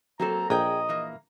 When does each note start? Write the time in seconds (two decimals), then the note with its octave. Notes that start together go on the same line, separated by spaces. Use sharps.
0.20 F#3 A#3 C4 A4 A#5
0.50 A#1 G#4 D#5 G5 A#5
0.89 E3 A#3